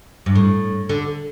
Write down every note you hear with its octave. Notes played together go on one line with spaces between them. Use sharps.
G2
A2
D3